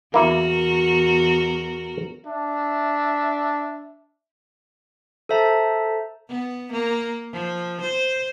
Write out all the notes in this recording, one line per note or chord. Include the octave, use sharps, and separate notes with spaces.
E2 A#3 E4 F#4 A#4
D4 E5
A4 C5 E5 A5 A#5
B3
A#3
F3
C5